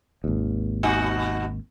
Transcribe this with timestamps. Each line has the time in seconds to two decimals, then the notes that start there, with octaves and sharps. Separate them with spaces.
0.24 G#1 D#2
0.83 B2 D#4 F#4